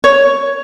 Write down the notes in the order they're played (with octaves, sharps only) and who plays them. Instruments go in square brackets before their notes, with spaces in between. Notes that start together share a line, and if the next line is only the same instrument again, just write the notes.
[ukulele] C#5